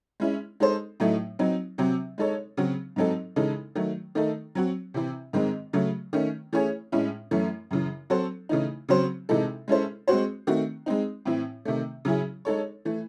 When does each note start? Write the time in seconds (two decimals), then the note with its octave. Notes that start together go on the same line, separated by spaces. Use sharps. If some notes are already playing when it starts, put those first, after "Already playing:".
0.20 G#3 C#4 E4
0.60 G#3 D#4 A4 C5
1.00 A2 F#3 A3 D#4
1.39 F#3 C4 D#4
1.78 C3 F#3 C4
2.18 G#3 D#4 A4 C#5
2.57 C#3 F#3 C4 F#4
2.96 G#2 F#3 C4 D#4 A4
3.36 C#3 E3 G#3 D#4 A4
3.75 D#3 F#3 A3
4.15 D#3 A3 D#4 A4
4.55 F#3 C4 F#4
4.94 C3 E3 C4
5.33 G#2 D#3 G#3 C4
5.73 C#3 F#3 A3
6.13 D#3 A3 C#4
6.53 E3 A3 C#4 G#4 C#5
6.92 A2 G#3 C#4 E4
7.31 F#2 E3 A3 C#4
7.71 F#2 C#3 E3
8.10 F#3 C4 F#4 A4 C5
8.49 C#3 E3 A3 D#4
8.89 C#3 F#3 C4 F#4 C5
9.29 C3 E3 G#3 D#4 A4
9.68 G#3 C#4 E4 A4 C5
10.08 G#3 C4 F#4 C5
10.47 D#3 A3 C4 F#4
10.86 G#3 C4 D#4
11.26 A2 E3 C4 E4
11.65 C3 D#3 A3
12.05 C#3 F#3 C#4 E4 G#4
12.45 G#3 D#4 A4 C#5
12.85 E3 A3